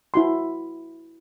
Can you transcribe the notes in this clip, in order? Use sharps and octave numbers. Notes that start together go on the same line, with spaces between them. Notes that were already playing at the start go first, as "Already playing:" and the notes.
E4 F#4 C6